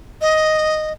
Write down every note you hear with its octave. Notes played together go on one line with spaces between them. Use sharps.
D#5